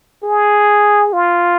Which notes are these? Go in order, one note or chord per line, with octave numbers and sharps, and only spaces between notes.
G#4
F4